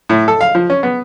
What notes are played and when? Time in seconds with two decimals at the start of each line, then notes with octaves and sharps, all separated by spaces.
0.09 A2
0.28 A4
0.41 F5
0.55 F3
0.70 C#4
0.83 B3